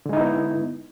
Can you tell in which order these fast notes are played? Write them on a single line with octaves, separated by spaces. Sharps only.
D3 G#3 D#4 E4 B3